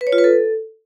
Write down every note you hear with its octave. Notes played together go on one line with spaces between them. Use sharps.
B4
C#5
F4
B4
A4